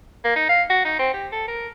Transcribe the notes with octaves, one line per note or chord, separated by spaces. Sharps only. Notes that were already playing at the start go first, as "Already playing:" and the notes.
A#3
D#4
F5
F#4
D#4
C4
G4
A4
A#4